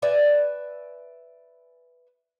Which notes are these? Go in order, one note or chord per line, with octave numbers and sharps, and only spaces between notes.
B4 D5 E5 G#5